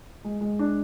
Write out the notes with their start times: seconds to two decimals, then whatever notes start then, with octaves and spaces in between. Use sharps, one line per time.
0.24 G#3
0.41 G#3
0.59 D4